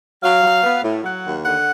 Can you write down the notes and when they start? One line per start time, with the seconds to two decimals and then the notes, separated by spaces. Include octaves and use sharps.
0.22 F#3 F5
0.43 F#3
0.63 B3
0.83 A2
1.04 F#3 F#5
1.24 D#2
1.44 D3 F#5